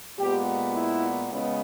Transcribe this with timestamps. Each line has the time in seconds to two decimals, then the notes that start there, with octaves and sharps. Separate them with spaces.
0.19 A#2 G#3 B3 G4
0.74 E4
1.29 C#3 G#3 B3